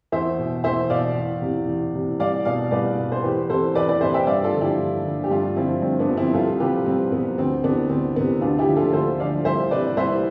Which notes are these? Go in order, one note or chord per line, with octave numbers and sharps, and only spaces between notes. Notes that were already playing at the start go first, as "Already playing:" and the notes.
E2 C5 E5
B2
E2 C5 E5
B2 D5 F5
E2
C3 E3
E2
C3 E3
C2 D5 F5
B2 D5 F5
C2 B4 D5
B2
C5
E2 G4 B4
C3 E3 A4 C5
E2 B4 D5
B4 D5
C3 E3 C5 E5
E5 G5
G2 D5 F5
F4 A4
D3 F3
E4 G4
G2
D3 F3
G4
G2 D4 F4
D3 F3 C4 E4
G2 C4
B3 D4
D3 F3
C4 E4
C2 F4 A4
C3 F3 G4 B4
C2 C4
C3 F3 B3
D2 C4
C3 E3 B3 D4
D2 C4
C3 E3 B3
D2 D4 F4
E4 G4
D3 F3
F4 A4
D2 A4 C5
D3 F3 D5 F5
C2 C5 E5
C3 E3 B4 D5
C2 C5 E5